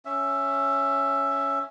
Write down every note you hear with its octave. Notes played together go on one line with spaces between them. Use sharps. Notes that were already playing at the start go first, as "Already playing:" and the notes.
C#4 E5